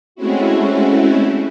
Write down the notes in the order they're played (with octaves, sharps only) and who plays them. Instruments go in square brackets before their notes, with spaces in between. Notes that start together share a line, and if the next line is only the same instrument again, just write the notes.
[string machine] G#3 A3 C4 C#4 E4 F#4